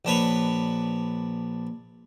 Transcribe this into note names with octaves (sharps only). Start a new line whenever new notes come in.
A#1 D4 B4 C#5